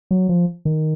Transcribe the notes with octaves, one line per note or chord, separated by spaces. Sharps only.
F#3
F3
D#3